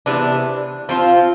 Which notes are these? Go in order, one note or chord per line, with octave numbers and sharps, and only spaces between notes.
C3 E3 B3 D4
F3 C4 F4